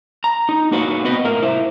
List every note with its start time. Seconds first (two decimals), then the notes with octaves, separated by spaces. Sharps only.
0.24 A#5
0.49 D#4
0.71 A#3 D#4 F#4 B4 C#5 F5
1.04 B3 C4 F#4 B4 D#5
1.24 A2 A#4 F5
1.42 E4 C5